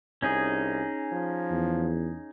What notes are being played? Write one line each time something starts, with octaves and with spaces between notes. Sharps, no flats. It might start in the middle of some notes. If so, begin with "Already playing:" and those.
C2 C#4 D#4 G#4
F3
E2